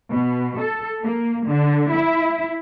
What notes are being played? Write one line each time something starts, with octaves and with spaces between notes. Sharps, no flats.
B2
A4
A#3
D3
E4